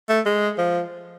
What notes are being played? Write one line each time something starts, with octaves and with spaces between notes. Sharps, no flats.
A3
G#3
F3